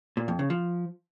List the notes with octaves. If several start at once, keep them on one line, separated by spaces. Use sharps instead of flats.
A#2
F2
C#3
F3